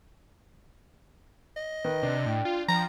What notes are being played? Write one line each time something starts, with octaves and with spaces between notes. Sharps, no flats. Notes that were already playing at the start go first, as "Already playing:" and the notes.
D#5
D#3 B4
C3 D4
A2 G5
F4
F3 A#5